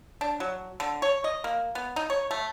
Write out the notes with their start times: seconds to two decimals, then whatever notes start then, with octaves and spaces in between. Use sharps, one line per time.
0.21 D4
0.40 F#3
0.80 D3
1.02 C#5
1.24 D#5
1.44 A#3
1.75 B3
1.96 D#4
2.10 C#5
2.31 A3